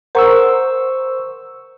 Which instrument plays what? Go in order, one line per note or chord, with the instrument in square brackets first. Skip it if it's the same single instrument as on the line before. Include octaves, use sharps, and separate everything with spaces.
[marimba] A#4 F#5 A#5 [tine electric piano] C5 C#6 E6